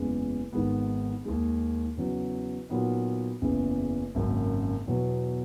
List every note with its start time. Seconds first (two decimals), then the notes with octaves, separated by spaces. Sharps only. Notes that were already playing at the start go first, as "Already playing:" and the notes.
Already playing: F#1 E2 C#3 G#3
0.53 G#1 G#2 D#3 G#3 B3
1.25 D#2 D#3 G#3
1.97 E2 C#3 F#3
2.69 A#2 F#3 B3 D#4
3.42 F#1 E2 C#3
4.15 G#1 F#2 C#3 F#3 A#3
4.87 E2 B2 F#3